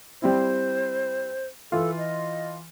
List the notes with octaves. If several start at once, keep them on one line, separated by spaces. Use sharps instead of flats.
G3 C4 E4 C5
E3 F4 A4
D#5